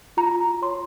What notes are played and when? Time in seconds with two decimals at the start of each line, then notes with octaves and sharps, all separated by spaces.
0.17 F4 A#5
0.62 C#5 C6